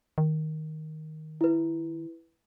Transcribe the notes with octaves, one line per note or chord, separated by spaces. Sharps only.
D#3
E4 B4